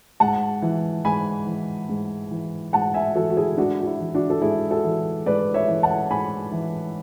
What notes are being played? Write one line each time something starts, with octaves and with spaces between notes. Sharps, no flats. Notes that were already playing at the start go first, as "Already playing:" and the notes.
G#2 F#5 A5
E3
G#2 G#5 B5
E3
G#2
E3
G#2 F#5 A5
E5 G#5
E3 F#4 A4
F#4
E4 G#4
G#2 D4 F#4
F#4
E4
E3
D4 F#4
A4
G#2 E4 G#4
F#4 A4
E3
G#2 B4 D5
C#5 E5
E3
F#5 A5
G#2 G#5 B5
E3